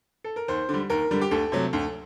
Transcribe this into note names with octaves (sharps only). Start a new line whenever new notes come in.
A4
A#4
D#2 C5
D3 G3
D#2 A#4
D3 G3
G4
D2 A4
C3 F#3 A3
D2